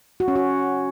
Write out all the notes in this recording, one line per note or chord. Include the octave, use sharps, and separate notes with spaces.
F#4
C#4
F#4